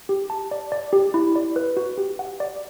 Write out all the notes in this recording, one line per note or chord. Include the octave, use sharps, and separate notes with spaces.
G4
A5
D5
D5
G4
E4
D5
B4
F#4
G4
F#5
D5